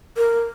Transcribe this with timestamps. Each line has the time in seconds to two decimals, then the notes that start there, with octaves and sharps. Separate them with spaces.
0.17 A#4